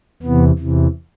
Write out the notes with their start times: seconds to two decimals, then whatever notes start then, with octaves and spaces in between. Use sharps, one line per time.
0.22 E2 C3 E3 B3
0.58 E2 C3 E3